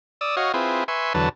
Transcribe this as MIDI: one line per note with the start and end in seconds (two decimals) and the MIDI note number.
0.21 0.36 74
0.21 0.36 87
0.21 0.36 88
0.37 0.52 66
0.37 0.52 73
0.37 0.52 75
0.37 0.52 77
0.54 0.84 60
0.54 0.84 64
0.54 0.84 65
0.54 0.84 68
0.54 0.84 71
0.88 1.13 71
0.88 1.13 76
0.88 1.13 80
0.88 1.13 84
0.88 1.13 85
1.14 1.29 40
1.14 1.29 50
1.14 1.29 54
1.14 1.29 59
1.14 1.29 81